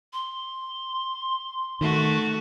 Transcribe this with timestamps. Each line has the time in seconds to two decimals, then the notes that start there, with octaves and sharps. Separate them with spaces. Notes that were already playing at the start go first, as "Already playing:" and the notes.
0.13 C6
1.81 D#3 A3 F#4